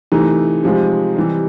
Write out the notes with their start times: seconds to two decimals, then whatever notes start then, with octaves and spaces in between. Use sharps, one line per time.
0.12 C3 E3 A3 D#4
0.63 C3 F3 G#3
1.16 C3 E3 G3